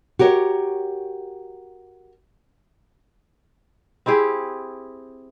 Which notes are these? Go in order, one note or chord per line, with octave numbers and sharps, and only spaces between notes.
F#4 G4 A#4 C#5
C4 E4 G4 G#4